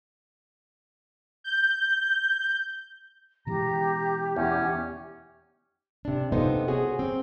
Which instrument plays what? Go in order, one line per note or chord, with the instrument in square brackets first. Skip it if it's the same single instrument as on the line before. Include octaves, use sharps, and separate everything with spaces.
[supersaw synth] G6
[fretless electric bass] B2 E3 G#3 [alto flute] G4 [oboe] A#5
[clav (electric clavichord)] E2 [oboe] C#4
[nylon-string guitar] C3 D4
C3 B3 D#4 F4 A4 C5
F#4 G#4 C5 C#5
C4